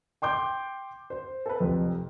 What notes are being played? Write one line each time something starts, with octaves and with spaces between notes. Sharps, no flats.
G5 C6 D6 G6
C5
A4 B4
F1 F2